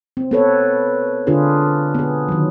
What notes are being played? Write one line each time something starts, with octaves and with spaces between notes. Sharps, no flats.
C4
B3 C4 A4 B4 C#5
D3 D4 F4 G#4 B4
B3 G#4
D#3 F#3